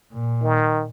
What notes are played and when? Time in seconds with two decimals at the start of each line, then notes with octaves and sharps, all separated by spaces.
0.14 A#2
0.43 D#3